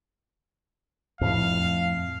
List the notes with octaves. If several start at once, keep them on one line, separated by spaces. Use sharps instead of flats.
F2 A2 F3 F5